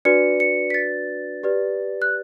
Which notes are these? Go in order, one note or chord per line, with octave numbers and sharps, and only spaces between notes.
D4 F#4 B4 D5 C#7
C#7
B6
A6
G4 B4 D5
F#6